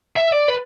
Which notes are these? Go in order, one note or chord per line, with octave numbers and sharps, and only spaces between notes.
E5
D5
B4